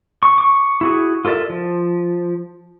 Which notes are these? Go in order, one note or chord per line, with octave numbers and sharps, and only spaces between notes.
C#6
C#6 D6
E4 F#4 G#4
F4 A4 A#4 D5 E5
F3